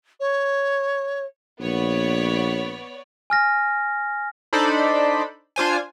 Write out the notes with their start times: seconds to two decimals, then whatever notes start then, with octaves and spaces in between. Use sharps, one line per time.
0.20 C#5
1.60 A#1 B3 C#5 D5
3.30 G#5 F6 A#6
4.53 D4 D#4 A4 C5 D5 B5
5.56 D4 F4 C5 G#5